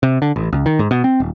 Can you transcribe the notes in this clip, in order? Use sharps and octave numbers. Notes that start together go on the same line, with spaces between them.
C3
D3
A1
C#2
D#3
G#2
B2
C4
D#1